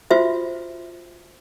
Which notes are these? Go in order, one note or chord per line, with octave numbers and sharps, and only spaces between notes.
F4 F#4 C5 E5